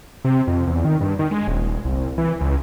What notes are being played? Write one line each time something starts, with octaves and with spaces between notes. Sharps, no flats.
C3
F2
E2
D#3
G2
D#3
G#3
D#1
C2
E3
C#2